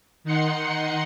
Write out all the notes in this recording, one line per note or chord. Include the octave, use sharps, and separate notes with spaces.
D#3 D#4 F#5 C6 C#7